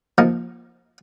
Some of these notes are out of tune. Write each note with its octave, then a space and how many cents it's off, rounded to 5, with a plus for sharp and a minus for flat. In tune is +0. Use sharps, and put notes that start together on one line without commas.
F3 +5 A#3 +10 D#4 +15